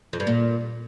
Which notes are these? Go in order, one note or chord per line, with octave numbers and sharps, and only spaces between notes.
F2
G2
A#2